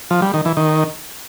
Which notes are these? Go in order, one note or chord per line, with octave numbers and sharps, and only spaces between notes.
F3
G3
D#3
E3
D#3